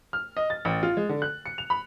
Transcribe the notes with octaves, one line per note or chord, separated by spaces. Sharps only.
F6
D#5
A6
A1
F4
G#3
D3
F#6
C#7
F7
B5